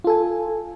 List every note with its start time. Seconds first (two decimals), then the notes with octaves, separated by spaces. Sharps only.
0.04 F4
0.07 A4
0.10 G#5